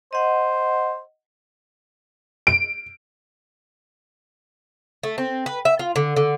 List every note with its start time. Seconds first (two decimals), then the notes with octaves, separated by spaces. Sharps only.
0.13 C5 D#5 F#5
2.47 D7
5.03 A3
5.18 C4
5.46 B4
5.65 E5
5.79 F4
5.96 D3
6.17 D3